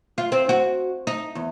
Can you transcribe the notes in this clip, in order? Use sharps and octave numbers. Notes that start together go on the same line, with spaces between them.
F4
C4
F#4
D#4
E2